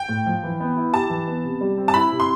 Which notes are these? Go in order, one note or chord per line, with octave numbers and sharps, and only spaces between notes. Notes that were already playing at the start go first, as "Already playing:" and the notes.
Already playing: G5
A2
F3
E3
B3
E4
G4 A5
E3
B3
C3
G3
C4
A5
E4 B5
C3
C6